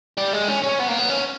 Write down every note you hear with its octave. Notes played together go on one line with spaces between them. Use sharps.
G3
G#3
C#4
C#4
B3
A#3
B3
C#4